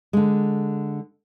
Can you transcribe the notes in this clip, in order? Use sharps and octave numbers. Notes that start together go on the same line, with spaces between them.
D3 G#3